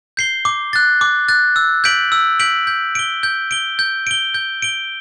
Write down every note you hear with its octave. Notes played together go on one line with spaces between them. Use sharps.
G6 C7 G7
D6
F#6 A6
D6
F#6 A6
E6
G6 B6 D7 F#7
E6
G6 B6 D7 F#7
G6
D7 G7
G6
D7 G7
G6
D7 G7
G6
D7 G7